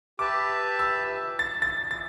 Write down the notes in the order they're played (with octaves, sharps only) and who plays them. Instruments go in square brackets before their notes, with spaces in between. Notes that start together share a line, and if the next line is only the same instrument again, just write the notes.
[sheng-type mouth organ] G4 B4 E5 A5 [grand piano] D6
[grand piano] E6
A6
A6
A6